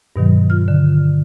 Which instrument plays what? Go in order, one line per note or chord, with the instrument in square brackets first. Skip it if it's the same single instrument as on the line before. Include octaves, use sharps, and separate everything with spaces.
[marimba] G2 B2 D#3 F#3
F4 F6
D3